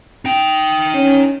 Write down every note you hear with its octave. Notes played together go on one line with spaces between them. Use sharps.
D#4 G5
C#4